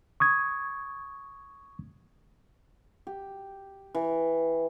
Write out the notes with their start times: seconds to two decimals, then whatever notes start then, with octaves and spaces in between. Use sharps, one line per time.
0.20 C#6 D#6 G#6
3.07 G4
3.95 E3